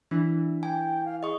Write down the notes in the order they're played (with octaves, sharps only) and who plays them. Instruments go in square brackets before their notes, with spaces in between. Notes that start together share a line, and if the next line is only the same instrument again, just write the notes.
[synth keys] E3 [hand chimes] D4
[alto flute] G5 [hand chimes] G#5
[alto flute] F5
[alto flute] G#4 [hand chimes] D#5 C#6